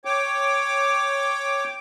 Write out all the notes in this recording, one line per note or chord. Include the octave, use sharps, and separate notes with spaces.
C#5 G5 D6